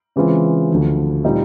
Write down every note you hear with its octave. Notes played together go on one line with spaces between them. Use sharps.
C#3 E3 G#3 C4 F4
D2 D3 F3
A#2 G3 C4 D#4